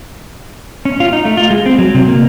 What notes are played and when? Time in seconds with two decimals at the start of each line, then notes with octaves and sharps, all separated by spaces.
0.85 C#4
1.00 F4
1.13 D#4
1.25 A3
1.37 F4
1.50 G#3
1.66 C4
1.79 F#3
1.95 C3
2.08 A#3